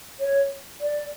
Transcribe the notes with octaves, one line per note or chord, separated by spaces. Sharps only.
C#5
D5